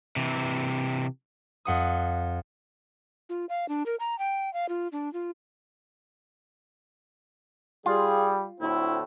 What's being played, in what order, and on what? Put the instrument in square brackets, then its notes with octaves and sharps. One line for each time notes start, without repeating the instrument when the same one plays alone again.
[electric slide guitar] C3 E3
[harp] F2 F#5 D#6
[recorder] F4
F5
D4
A#4
A#5
G5
F5
F4
D4
F4
[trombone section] G3 [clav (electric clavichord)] F4 [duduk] G#4
[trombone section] D2 A2 C4 [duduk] E4